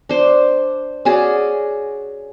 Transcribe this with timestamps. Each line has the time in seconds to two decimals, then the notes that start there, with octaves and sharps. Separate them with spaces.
0.09 D4 C5
1.05 C#4 F#4 G#4 D5